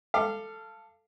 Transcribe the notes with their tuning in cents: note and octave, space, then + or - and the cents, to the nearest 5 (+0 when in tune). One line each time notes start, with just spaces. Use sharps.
A4 +5 F5 -20 D6 +20